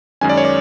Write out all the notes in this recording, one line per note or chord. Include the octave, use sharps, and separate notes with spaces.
F#2 D#3 G#3 C#4 G#5
D5
C#5
D5